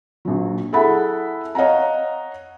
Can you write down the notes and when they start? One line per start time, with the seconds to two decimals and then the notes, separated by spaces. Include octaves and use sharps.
0.25 A#1 F#3
0.73 E4 G#4 A4 E5 F#5 B5
1.55 C#5 D#5 F5 F#5 A#5